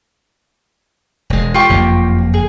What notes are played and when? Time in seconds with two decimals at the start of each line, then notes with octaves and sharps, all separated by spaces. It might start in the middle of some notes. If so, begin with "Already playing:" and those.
1.30 E1 G#3
1.54 F4 G4 C#6
1.69 F#1 F2 A#3
2.34 G#4